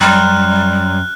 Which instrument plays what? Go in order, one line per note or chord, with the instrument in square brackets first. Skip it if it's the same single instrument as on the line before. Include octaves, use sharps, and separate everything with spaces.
[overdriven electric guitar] F#2 [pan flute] G3 [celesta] G5 A#5 C6 [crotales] F6 F#6